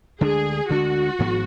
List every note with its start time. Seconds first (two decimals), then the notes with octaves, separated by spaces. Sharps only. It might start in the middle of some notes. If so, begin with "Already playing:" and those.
0.20 D2 D3 G#3 D4 G#4
0.69 D2 D3 G#3 D4 F#4
1.19 G#1 G#2 F3 B3